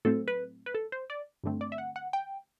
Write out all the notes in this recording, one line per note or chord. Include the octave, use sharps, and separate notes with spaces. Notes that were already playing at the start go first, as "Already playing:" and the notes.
A2 F#3 A3 C4 A4
B4
B4
A4
C5
D5
G2 D3 A3 C4
D5
E5
F#5
F#5
G5